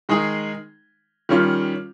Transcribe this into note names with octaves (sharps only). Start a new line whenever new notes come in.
D#3 G#3 D#4 G#4
D#3 G3 C#4 F4